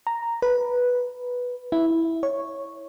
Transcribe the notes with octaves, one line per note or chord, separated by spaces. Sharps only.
A#5
B4
E4
C#5